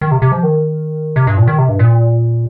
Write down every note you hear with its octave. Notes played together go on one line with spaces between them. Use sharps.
D#3
C3
C3
F3
D#3
C3
G2
A#2
D#3
C3
G2
A#2